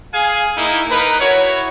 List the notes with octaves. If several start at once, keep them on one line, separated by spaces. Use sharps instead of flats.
G#4 F5 G#5
A#3 D#4 E4
D#4 A#4 B4
E4 F#4 C#5